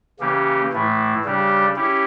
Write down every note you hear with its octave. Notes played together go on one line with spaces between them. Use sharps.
C#3 E3 A#3 C#4 G4
A2 E3 A3 E4
C#3 G3 D4 G4
C#4 E4 G4